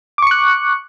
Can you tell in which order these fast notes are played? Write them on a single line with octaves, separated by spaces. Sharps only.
D6 C#6 C#7 F#6